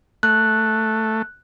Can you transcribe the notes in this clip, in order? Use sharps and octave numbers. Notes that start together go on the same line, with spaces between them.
A3 F#6